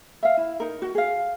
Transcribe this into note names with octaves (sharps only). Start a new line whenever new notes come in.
E5 F5
E4
D#4 A#4
F#4
G#4 F5